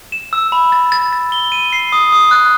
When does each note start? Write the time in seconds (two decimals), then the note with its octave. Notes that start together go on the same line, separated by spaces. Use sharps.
0.12 E7
0.33 E6
0.52 B5
0.72 A6
0.92 A6
1.13 A6
1.32 G7
1.52 D#7
1.73 C7
1.92 D#6
2.12 D#6
2.31 F#6